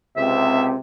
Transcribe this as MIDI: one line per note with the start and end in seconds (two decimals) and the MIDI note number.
0.17 0.78 37
0.17 0.78 48
0.17 0.77 60
0.17 0.64 76